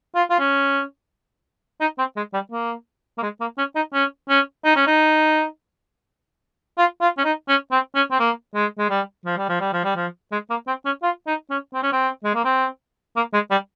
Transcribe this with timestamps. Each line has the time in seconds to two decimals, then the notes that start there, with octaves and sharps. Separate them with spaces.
0.15 F4
0.30 F4
0.39 C#4
1.81 D#4
1.98 C4
2.16 G#3
2.34 G3
2.52 A#3
3.18 A#3
3.23 G#3
3.40 A#3
3.58 C#4
3.76 D#4
3.94 C#4
4.29 C#4
4.65 D#4
4.76 C#4
4.87 D#4
6.78 F4
7.01 F4
7.18 C#4
7.25 D#4
7.49 C#4
7.71 C4
7.95 C#4
8.11 C4
8.20 A#3
8.55 G#3
8.78 G#3
8.90 G3
9.26 F3
9.38 G3
9.49 F3
9.61 G3
9.73 F3
9.84 G3
9.96 F3
10.32 G#3
10.50 A#3
10.67 C4
10.86 C#4
11.03 F4
11.27 D#4
11.50 C#4
11.74 C4
11.83 C#4
11.92 C4
12.24 G#3
12.35 A#3
12.45 C4
13.16 A#3
13.34 G#3
13.51 G3